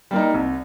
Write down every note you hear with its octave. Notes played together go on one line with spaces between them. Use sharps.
G3 A#3 D#4
C2